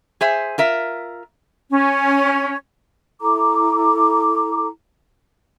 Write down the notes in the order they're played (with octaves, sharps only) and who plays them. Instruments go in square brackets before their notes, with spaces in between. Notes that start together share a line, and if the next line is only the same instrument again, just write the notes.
[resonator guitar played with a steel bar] G#4 C5 E5 G#5
F4 A#4 E5
[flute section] C#4
E4 A4 A#5 D6